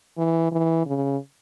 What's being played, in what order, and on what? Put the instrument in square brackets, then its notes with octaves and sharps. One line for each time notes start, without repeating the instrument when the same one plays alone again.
[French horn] E3
E3
C#3